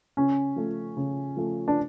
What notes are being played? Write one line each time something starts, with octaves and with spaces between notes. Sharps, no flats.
C#3 C#4
F3 A3
C#3
F3 A3
D4